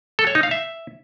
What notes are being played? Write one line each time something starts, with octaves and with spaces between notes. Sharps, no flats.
A4
C#5
D#4
F5
E5